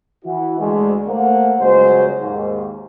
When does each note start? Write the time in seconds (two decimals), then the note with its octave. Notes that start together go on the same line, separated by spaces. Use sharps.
0.25 E3 E4 F#4
0.59 D2 G#3
1.07 A3 A#3 C5 F#5
1.59 G1 C#2 F#3 G#3 C5
2.20 D#2 G#2